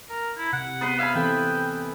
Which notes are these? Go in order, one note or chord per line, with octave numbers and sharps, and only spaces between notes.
A#4
E4
C3 F#5
B3 B4 C6
E5 F5 G#5 B5
E3 C4 A4 G5